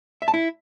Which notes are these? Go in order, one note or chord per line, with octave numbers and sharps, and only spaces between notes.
E5
A5
E4